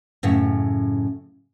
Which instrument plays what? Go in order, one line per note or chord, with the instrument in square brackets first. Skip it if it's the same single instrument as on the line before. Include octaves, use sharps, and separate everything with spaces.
[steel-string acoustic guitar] F#2 A2 C#3